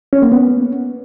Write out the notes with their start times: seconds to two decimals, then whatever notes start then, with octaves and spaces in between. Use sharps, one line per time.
0.13 C#4
0.22 A#3
0.32 B3